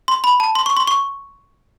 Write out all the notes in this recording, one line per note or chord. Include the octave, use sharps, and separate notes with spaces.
C6
B5
A5
C6
C#6
C6
C#6